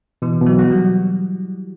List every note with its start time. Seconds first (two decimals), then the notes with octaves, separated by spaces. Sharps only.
0.22 B2 E3
0.41 B2
0.46 F#3
0.58 F#4
0.64 F#3
0.71 G3